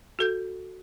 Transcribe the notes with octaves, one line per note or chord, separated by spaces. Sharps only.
F#4 A4 G6